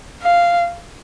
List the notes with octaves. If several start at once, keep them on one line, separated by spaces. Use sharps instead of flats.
F5